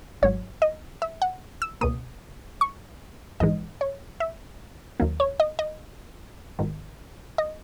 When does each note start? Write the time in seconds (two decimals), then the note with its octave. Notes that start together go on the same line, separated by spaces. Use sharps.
0.22 G#1 G#2 F#3 C#5
0.62 D#5
1.02 E5
1.22 F#5
1.62 E6
1.81 C#2 B2 A#3 D#6
2.61 C#6
3.40 A#1 G#2 E3 G#3 D#4 D#5
3.81 C#5
4.20 E5
5.00 D#2 D#3 F#3 A#3
5.20 C#5
5.40 D#5
5.59 D#5
6.59 G#1 G#2 D#3
7.38 D#5